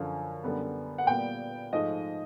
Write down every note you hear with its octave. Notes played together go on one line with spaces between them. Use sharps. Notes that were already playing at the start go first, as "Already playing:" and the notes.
Already playing: F#2 D3 F3
F#2 D3 G3 B3
F#5
A#2 G3 B3 G5
G#2 F3 A3 D#5